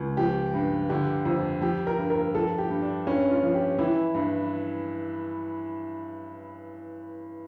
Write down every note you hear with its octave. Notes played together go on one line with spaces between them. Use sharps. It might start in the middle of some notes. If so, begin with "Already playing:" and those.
Already playing: C#2
F3 G4
G2
D3 G4
F2
F3 G4
A#4
G2
A#4
F3 A4
G4
G2
D4
G2 C#4
F4
F3
G4
E3 E4
G2